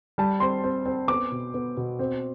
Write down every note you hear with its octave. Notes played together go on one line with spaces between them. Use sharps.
G3 A5
C4 C6
C4
C4
B3 D6
B2
B3
B2
C4